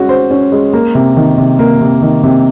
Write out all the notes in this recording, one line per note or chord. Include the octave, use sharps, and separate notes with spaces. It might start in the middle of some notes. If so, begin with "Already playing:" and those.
Already playing: G#3 C#4 F#4
C5
C#4
G#3
A#3
C3
D#3
C3
A#3
C3
D#3
C3